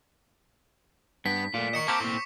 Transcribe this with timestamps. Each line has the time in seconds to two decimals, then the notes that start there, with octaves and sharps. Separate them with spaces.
1.26 G2 B3 B6
1.54 A#2 A3 F4
1.73 A#4 D#5 C#6 C#7 E7
1.88 A#3 C4 G4 A5 D6
2.00 A2 A#3 C4